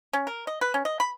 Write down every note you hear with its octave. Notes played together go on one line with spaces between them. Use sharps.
C#4
A#4
D#5
B4
C#4
D#5
B5